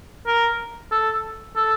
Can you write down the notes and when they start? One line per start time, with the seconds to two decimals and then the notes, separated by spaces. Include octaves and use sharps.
0.27 A#4
0.92 A4
1.56 A4